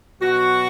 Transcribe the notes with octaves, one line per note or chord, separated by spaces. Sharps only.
B2 F#3 F#4